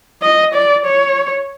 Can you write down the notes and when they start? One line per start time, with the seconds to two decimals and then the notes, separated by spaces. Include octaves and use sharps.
0.22 D#5
0.54 D5
0.86 C#5